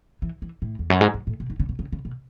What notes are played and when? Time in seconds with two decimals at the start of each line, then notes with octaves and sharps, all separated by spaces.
0.22 E3
0.42 E3
0.62 A2
0.79 E2
0.90 F#2
1.01 G#2
1.14 F#2
1.27 A2
1.40 B2
1.50 D#3
1.60 C#3
1.69 B2
1.79 C#3
1.92 C#3
2.05 B2